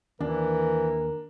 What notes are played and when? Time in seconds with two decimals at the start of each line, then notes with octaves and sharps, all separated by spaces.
0.21 D#2 E3 D4 A#4